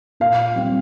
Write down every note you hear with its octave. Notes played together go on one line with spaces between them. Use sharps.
A#2 F5
G3 C4